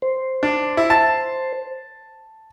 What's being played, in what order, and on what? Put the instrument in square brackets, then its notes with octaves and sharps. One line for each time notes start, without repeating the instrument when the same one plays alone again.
[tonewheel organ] C5
[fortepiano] D4
E4
A5